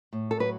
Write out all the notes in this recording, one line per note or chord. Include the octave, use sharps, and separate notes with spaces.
A2
A4
F#3 B4